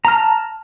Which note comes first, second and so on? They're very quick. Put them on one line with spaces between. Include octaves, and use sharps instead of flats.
A#5 F6 A5